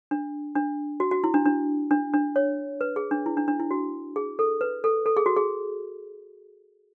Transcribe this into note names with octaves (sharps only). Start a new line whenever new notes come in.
D4
D4
F#4
F#4
E4
D4
D4
D4
D4
C#5
B4
G#4
D4
E4
D4
D4
E4
F#4
G#4
A4
B4
A4
A4
G#4
F#4
G#4